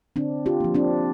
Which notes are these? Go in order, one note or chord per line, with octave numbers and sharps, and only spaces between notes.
D3 C4 D4
F4 G4
F3 A#3
C4 D4